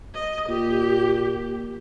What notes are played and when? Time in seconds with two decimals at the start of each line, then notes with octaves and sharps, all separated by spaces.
0.14 D#5
0.49 A#2 G4